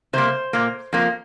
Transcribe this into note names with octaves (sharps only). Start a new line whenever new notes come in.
C3 G3 A#3 C5
A#2 A#3
F2 F3 A#3